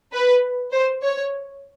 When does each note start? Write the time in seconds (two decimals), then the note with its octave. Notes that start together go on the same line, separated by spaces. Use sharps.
0.13 B4
0.73 C5
1.02 C#5